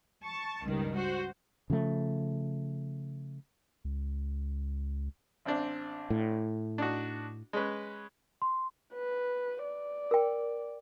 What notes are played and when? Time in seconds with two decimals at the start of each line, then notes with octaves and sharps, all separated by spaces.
0.23 A5 C#6
0.65 C#2 G2 D#3 G3
0.95 F#4 C5
1.70 C#3 F3 A3
3.85 C#2
5.45 A1 C4 D4
6.10 A2
6.78 D4 D#4 F#4
7.53 G#3 C#4 B4
8.42 C6
8.94 B4
9.64 D5
10.11 A#4 G5